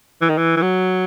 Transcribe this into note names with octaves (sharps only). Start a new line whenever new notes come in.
E3
D#3
E3
E3
F#3